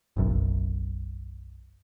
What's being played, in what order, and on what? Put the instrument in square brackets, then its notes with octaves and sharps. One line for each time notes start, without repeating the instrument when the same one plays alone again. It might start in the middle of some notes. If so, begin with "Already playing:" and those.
[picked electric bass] F#1 B1 F#2